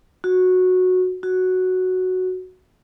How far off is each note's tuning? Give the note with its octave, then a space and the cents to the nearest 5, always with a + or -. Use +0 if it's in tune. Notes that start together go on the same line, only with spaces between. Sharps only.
F#4 -10
F#4 +0